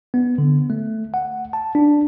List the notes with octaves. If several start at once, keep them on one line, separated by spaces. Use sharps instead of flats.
B3
D3
A3
F#5
A5
D4